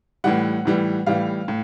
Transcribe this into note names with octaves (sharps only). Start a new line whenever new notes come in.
A2 E3 G3 F#5
A2 E3 G3
A2 E3 G3 F5
A2